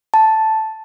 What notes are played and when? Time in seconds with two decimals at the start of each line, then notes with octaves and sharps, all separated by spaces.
0.14 A5